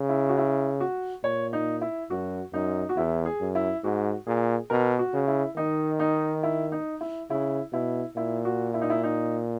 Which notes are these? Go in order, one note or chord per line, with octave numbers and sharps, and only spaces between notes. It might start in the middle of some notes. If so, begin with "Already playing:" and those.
Already playing: C#3
E4
F#4
E4
F#4
A#2 C#5
D#4
E4
F#2 F#4
F#2 D#4
F#4
E2 E4
G#4
F#2
E4
G#2 F#4
A#2 G#4
B2 A#4
F#4
C#3
E4
D#3 D#4
D#4
E4
D#4
E4
C#3 E4
B2 E4
A#2 E4
F#4
E4
D#4
E4
D#4